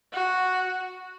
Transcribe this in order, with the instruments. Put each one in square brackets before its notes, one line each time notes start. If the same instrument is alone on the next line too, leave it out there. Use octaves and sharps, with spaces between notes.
[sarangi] F#4